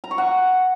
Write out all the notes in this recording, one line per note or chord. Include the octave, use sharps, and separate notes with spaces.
A#5
C#6
F#5